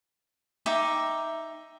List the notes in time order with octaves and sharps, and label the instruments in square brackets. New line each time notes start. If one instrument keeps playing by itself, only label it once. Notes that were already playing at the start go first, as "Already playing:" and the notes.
[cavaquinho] D#4 E5 G5 D6